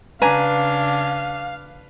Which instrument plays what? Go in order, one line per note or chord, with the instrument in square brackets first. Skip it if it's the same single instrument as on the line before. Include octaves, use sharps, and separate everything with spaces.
[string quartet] C#3 D4 [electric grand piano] B4 [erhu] F5 [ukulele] G#5 A#5